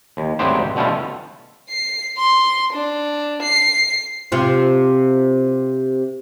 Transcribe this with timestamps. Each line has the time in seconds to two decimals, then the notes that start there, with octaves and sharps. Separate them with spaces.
0.17 D#2
0.39 G#1 D2 F#3 B3 G4 C5
0.76 B2 D3 G3 A3 C#4 F4
1.69 C7
2.18 C6
2.73 D4
3.42 C7
4.32 C3 F4